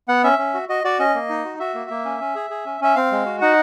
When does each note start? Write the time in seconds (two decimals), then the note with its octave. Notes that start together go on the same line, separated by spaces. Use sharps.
0.08 B3 F#5
0.24 C#4 E5
0.39 C#4
0.54 F#4
0.69 F#4 D#5
0.84 F#4 D5
0.99 C#4 D#5
1.15 A#3
1.29 D#4
1.45 F#4
1.59 F#4 E5
1.74 A#3
1.90 A#3
2.05 C#4
2.20 C#4
2.35 G#4
2.50 G#4
2.66 C#4
2.81 C#4 E5
2.96 C4 F5
3.12 G#3
3.26 F#4
3.41 D#4 F#5